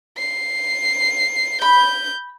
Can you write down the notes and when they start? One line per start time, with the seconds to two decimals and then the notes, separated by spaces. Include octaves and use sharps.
0.18 C7
1.62 B5 G6